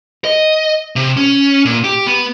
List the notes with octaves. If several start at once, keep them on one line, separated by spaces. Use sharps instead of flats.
D#5
C3
C#4
A#2
G4
B3